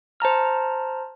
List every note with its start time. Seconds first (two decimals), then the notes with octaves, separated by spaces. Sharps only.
0.20 C5 A5 A#5 F6